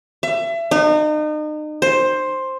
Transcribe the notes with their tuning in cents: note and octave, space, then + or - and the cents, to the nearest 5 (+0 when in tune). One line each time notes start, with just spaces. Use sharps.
E5 +30
D#4 -35
C5 +10